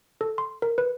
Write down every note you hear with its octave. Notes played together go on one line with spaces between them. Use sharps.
A4
C6
A#4
B4